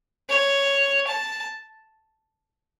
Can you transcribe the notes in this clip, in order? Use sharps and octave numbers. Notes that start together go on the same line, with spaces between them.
C#5
A5